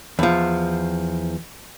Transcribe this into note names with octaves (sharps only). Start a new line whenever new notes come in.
E2 F3